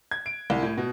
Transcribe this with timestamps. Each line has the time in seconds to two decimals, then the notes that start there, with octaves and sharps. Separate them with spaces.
0.11 G#6
0.26 D7
0.50 C2
0.62 A2
0.77 B2